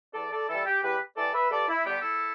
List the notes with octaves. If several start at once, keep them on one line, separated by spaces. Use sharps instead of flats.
E2 A4 D5
A4 D5
E3 G3 E4 A4
G4
E2 G4 B4
E3 G3 A4 D5
B4 E5
G2 A4 D5
E4
D3 G3 B3 G4
E4 A4